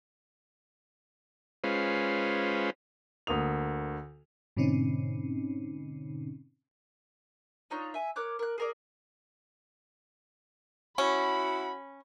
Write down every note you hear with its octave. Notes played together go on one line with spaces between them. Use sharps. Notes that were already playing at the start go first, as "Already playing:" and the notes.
G#3 C#4 F4 B4 C5
D2 A#3 D#6 F7
G#2 B2 D3 C4 C#4 D#4
D4 D#4 F4 C#5
E5 G#5
A#4 C#5 D6 F#6
A#4 F#6
G#4 A#4 D5
C#4 E4 F#4 B5